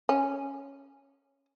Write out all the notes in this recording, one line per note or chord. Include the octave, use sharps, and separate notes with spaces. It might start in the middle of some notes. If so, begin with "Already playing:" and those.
C#4